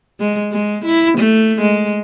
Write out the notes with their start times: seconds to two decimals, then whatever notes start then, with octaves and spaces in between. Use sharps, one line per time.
0.20 G#3
0.52 G#3
0.85 E4
1.18 A3
1.61 G#3